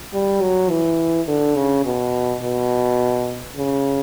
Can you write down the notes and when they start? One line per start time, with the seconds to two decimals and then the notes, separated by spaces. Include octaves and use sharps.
0.13 G3
0.41 F#3
0.69 E3
1.27 D3
1.56 C#3
1.85 B2
2.42 B2
3.56 C#3